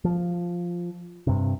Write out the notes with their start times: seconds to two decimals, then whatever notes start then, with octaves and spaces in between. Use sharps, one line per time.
0.04 F3
1.27 G2 C3